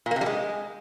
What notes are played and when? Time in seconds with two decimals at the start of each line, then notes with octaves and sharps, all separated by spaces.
0.06 A#2
0.11 A#3
0.16 C3
0.21 G3
0.26 G#3